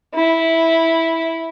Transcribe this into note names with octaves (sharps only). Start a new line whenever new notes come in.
E4